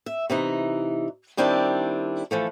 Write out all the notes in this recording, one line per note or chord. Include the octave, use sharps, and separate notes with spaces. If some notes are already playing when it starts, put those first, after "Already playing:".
E5
C3 E3 D#4
D#3 G3 C4 D4 E4 A5
E3 F3 A3